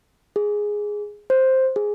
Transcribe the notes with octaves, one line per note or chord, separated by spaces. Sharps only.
G#4
C5
G#4